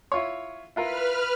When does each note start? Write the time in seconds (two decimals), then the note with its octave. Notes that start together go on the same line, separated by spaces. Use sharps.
0.12 E4 F4 C#5
0.76 E4 F4 A#4 B4 F6